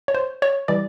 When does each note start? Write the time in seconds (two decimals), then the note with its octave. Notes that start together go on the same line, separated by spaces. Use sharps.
0.08 C#5
0.15 C5
0.42 C#5
0.68 E3 G3 D5